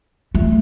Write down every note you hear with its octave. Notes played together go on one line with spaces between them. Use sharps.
A3